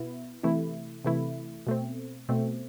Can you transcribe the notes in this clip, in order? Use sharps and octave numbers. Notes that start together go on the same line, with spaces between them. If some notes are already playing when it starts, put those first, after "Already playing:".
Already playing: B2 B3 E4
C3 E3 A3 E4
C3 E3 A3 E4
B2 A3 C4
B2 A3 C4